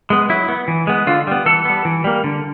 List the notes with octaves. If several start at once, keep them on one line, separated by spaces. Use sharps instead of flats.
G#3 B3
F#3 E4
B3
E3
G#3 B3
D3 F4
G3 B3
E3 A4
G3 B3
E3
G3 A#3
D3